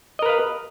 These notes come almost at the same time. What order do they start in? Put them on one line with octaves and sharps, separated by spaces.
D#5 A#4 B4 F5